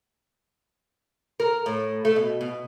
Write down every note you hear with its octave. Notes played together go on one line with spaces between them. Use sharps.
A#4
A2
A3
B2
B2